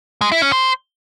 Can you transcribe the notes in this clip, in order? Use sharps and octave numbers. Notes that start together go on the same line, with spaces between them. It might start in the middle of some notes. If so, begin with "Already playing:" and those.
G#3
E4
C#4
C5